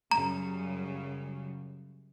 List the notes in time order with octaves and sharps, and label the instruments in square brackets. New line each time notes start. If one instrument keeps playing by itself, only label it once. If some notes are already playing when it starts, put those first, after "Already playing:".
[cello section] F#2 C#3 G3 [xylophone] A#5